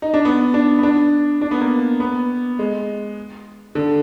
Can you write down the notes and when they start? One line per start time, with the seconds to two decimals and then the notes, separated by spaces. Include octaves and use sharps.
0.02 D#4
0.14 D4
0.25 B3
0.54 D4
0.79 B3
0.83 D4
1.41 D4
1.51 B3
1.61 A#3
2.00 B3
2.59 G#3
3.75 D3